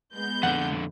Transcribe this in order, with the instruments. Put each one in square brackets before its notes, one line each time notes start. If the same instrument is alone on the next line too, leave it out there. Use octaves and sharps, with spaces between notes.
[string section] G#3 B3 G6
[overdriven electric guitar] F2 D3 [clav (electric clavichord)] F#5